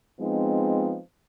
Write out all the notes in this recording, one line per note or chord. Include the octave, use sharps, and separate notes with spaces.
F3 G#3 B3 C4 D#4